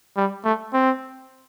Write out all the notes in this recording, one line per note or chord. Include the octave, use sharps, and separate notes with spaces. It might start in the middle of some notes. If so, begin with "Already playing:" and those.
G3
A3
C4